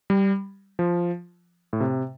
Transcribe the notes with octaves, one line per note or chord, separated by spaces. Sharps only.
G3
F3
A2
C3